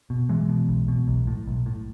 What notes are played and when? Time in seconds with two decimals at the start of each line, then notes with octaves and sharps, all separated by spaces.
0.10 B2
0.29 B1 E3 G#3
0.49 B2
0.69 B1
0.88 B2
1.08 B1
1.27 A2
1.47 B1
1.66 A2